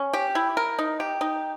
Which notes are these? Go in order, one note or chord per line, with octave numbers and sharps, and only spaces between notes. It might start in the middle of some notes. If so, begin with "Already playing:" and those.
Already playing: C#4
G4
E4
A#4
D#4
G4
D#4